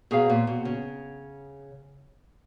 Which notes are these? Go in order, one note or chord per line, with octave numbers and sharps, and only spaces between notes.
B2 G#4 C#5 F5 A#5
A#2
B2
C#3